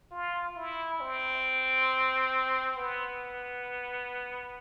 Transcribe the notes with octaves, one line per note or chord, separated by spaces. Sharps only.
F4
E4
C4
B3